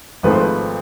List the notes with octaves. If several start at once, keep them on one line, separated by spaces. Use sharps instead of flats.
G#1 G#2 F3 A3 B4
C5
B4